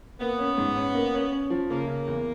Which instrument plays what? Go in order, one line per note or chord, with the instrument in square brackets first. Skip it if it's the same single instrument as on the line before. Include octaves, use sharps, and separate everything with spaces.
[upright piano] A#3 [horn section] B3
[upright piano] C#4
G#2
C#4
A#3
C#4
C#4
F3
[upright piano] C#3 [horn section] A#3
[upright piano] C#3
E2